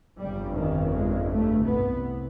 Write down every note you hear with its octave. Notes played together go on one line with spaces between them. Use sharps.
G1 F2 C#3 G3
D#3
G#3
A3
C2 C3 B3